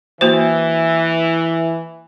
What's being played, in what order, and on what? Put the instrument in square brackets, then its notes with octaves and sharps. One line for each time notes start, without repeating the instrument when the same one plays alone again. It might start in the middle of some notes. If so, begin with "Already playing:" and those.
[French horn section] E3 [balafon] A#3 F#4 C5